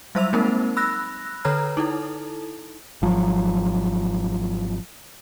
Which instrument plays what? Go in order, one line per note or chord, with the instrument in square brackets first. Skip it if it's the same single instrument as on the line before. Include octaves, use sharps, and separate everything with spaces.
[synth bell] F#3 G3 C5 E5 E6 F7
G#3 A#3 C4 D#4 A#4 C5
B5 E6 F#6 A#6
D3 A4 B4 C#5 A#5 F6
D#4 E4 A4
[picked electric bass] G#1 F3 F#3